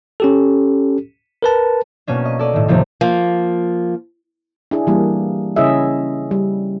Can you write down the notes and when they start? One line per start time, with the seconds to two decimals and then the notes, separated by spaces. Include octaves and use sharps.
0.20 C#4 G4 A4
1.42 A#4 B4 A5
2.07 B2 A#3 C#4 D4
2.25 D#5
2.39 A4 D5 D#5
2.53 A2 D#3
2.68 D#2 A2 C3 F3 A#3
3.01 F3 A#3
4.71 D4 E4 G#4
4.87 E3 G3 A#3
5.56 C#3 C#4 E4 G#4 D#5 E5
6.31 G3